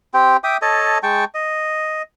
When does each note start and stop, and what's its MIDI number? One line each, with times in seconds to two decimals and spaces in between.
0.14 0.37 60
0.14 0.37 67
0.14 0.37 79
0.44 0.57 76
0.44 0.57 79
0.44 0.57 86
0.44 0.57 87
0.62 0.98 69
0.62 0.98 73
0.62 0.98 75
0.62 0.98 81
1.03 1.25 56
1.03 1.25 79
1.03 1.25 81
1.03 1.25 85
1.34 2.02 75